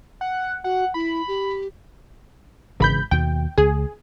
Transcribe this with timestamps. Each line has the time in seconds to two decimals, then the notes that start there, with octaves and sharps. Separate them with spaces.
0.21 F#5
0.64 F#4 F#5
0.94 E4 B5
1.28 G4
2.80 G#1 C#3 E3 B5 G6
3.11 D#2 B2 G5
3.58 C#2 G#4